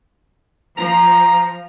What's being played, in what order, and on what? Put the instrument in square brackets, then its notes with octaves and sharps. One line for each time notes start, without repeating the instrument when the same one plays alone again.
[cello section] F3 [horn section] A#5